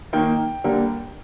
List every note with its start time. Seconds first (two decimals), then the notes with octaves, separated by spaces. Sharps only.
0.13 D#3 A#3 G5
0.64 D3 G3 A#3